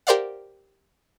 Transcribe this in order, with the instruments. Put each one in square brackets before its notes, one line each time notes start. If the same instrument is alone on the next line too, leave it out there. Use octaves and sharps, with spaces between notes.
[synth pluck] G4 A#4 C5 D5 F5 F#5